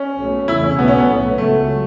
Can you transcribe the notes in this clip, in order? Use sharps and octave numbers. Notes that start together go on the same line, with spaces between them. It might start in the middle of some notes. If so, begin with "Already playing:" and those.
Already playing: C#4
B1 B2 A3
E2 C#3 A3 E4
C#4
B1 B2 A3 B3
C#4
B3
B1 A2 A3
C#2 C#3 F#3 A3